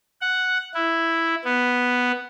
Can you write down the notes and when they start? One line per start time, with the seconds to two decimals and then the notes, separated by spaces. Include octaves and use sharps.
0.21 F#5
0.74 E4
1.45 B3